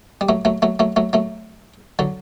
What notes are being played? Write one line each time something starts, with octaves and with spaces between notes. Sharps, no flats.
G3
F#3 A3
F#3 A3
F#3 A3
F#3 A3
F#3 A3
F#3 A3
D3 F#3